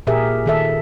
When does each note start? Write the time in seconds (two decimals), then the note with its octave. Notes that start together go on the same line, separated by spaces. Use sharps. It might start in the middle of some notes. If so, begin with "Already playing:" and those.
0.07 A#2 G4 G#4 A#4 E5
0.46 D#3 A4 E5